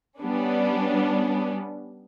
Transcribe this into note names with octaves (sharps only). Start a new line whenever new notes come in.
G3 B3 C#4 D4